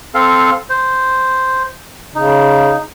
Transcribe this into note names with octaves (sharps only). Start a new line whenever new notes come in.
C4 A4 F5
C5
C#3 D#4